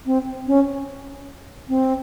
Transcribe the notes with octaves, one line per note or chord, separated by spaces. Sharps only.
C4
C#4
C4